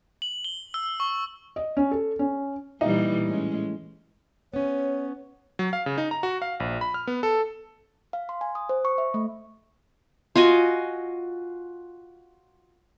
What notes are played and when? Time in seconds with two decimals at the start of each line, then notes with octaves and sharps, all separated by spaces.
0.22 F#7
0.45 G7
0.74 E6
1.00 C#6
1.56 D#5
1.77 C#4
1.91 A4
2.19 C#4
2.81 A#2 E3 G3 D#4
3.27 A2 G#3 C#4
4.54 B3 C#4 C#5
5.59 F#3
5.73 F5
5.86 C#3
5.98 D#4
6.11 A#5
6.23 F#4
6.42 F5
6.60 A#1
6.81 B5
6.94 F6
7.07 B3
7.23 A4
8.13 F5
8.29 C6
8.41 G#5
8.55 D#6
8.69 C5
8.85 C#6
8.98 E5
9.14 A3
10.35 F4 F#4 D#5 G#5